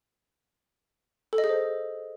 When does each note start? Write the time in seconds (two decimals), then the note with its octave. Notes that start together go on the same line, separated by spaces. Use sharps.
1.33 A4
1.38 D#5
1.44 G#4
1.49 C5